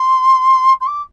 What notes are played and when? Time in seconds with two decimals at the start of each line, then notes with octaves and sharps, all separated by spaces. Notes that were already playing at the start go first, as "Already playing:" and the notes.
Already playing: C6
0.81 C6
0.87 D6